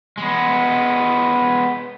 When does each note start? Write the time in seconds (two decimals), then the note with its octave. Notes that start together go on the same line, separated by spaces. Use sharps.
0.18 G#3 B3